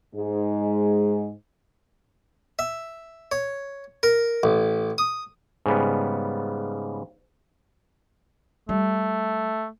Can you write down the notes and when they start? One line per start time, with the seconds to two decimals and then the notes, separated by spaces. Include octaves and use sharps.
0.16 G#2 G#3
2.59 E5
3.32 C#5
4.03 A#4
4.43 A1
4.98 D#6
5.66 G#2 C#3 G3 B3
8.69 G3 A3